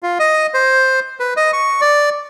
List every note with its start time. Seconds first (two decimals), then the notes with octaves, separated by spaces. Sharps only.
0.03 F4
0.19 D#5
0.54 C5
1.20 B4
1.37 D#5
1.53 C#6
1.81 D5